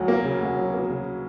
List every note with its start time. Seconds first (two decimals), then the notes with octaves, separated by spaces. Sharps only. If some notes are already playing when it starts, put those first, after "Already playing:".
Already playing: D2 F#3
0.08 A#3
0.24 C#3
0.41 D2
0.57 F#3
0.74 A#3
0.90 C#3